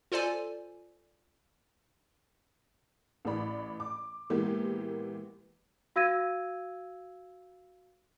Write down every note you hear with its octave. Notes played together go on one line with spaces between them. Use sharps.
F4 A4 C5 D5 G#5
A1 A2 E3 D5 B5
D6
A#2 E3 G#3 A#3 B3 G4
F#4 F5 E6 G#6 A#6 D#7